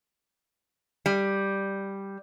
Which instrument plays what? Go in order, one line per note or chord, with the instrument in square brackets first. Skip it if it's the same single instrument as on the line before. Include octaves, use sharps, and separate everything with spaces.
[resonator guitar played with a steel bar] G3